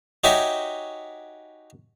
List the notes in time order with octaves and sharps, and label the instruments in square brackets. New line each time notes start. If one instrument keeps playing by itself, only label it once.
[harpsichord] D#4 F#4 G4 C#5 E5 G#5